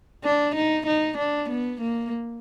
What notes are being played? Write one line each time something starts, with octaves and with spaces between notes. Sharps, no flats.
D4
D#4
D#4
D4
B3
A#3